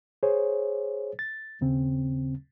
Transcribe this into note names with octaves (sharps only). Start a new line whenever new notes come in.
G#4 C5 C#5
A6
D#2 C#3 C4